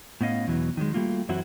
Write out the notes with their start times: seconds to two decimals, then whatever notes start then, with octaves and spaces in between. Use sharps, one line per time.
0.21 A2 B3 C#4 D#5 F5
0.47 E2 B2 E3 F#3
0.77 D#3 F#3 G#3
0.93 G3 A3 A#3 F4 F#4
1.29 F#2 E3 F#3 C4 E4 F#4